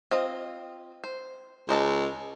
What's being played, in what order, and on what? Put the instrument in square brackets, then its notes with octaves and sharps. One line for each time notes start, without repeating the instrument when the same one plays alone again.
[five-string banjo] C4 F4 D#5
C5
[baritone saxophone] C#2 [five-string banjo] C5 D#5 A5